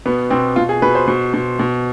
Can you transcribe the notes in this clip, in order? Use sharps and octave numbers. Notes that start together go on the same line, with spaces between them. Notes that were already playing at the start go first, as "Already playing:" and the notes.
B2 B3
B2 C4
B2 F4
G#4
B2 B4
C5
B2
B2
B2